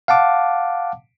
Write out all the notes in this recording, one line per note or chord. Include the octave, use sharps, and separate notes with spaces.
F5 F#5 A5 D6